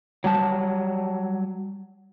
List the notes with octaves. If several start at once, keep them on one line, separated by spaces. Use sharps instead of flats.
F#3 G3 A5